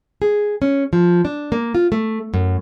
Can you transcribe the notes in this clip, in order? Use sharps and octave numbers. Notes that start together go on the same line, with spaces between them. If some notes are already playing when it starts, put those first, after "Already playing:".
G#4
C#4
F3
D4
A#3
F4
A3
F#2